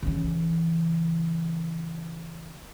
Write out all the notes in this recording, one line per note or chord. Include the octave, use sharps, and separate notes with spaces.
C#3 E3